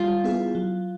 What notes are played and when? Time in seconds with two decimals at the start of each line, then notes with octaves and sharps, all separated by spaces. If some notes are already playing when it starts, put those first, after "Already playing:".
Already playing: G3 F4
0.24 B3 E4 G#4
0.55 F#3